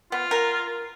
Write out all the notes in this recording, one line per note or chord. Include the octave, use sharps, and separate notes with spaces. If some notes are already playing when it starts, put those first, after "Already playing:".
B3 F4
A#4